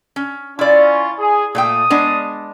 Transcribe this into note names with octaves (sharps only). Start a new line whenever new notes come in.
C#4
C#4 E4 F4 D5
G#4
A#2 A3 G5 D#6
G#3 B3 D4